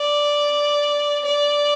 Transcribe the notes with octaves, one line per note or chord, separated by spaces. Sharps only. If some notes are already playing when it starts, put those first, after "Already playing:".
Already playing: D5
D5